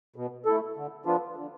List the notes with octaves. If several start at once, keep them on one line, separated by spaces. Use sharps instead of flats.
B2
A3 E4 A4
D3
F3 B3 D4 F4
D3